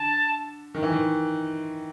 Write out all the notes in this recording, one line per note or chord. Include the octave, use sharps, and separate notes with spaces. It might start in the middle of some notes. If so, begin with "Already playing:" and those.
Already playing: D3 A5
D#3
E3
D#3